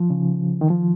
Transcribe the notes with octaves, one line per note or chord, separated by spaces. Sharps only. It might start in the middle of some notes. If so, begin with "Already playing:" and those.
Already playing: F3
C#3
D#3
F3